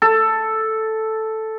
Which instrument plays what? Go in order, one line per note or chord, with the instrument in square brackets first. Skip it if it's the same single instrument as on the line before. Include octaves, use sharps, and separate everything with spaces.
[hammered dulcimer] A4